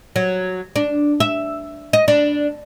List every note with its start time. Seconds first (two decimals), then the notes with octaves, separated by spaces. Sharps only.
0.16 F#3
0.76 D4
1.20 E5
1.93 D#5
2.08 D4